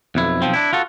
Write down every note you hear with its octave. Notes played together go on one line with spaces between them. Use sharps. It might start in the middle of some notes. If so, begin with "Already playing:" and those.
B1 F2 E4
B1 F3 C4
D4 E4
F4 F#4 A4